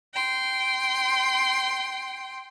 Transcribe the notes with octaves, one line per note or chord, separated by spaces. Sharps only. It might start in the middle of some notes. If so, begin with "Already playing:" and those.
G5 C6